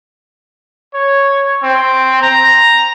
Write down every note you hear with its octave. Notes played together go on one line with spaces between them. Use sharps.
C#5
C4
A#5